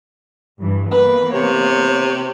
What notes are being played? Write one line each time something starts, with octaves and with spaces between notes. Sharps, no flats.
G2 E3
E3 A#3 B3 B4
C3 C#5